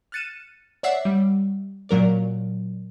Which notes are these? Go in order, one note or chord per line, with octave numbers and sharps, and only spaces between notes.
F6 F#6 A6 C#7 D#7 E7
C#5 D5 E5 F#5 E6 C7
G3
A#2 F#3 A#4 D5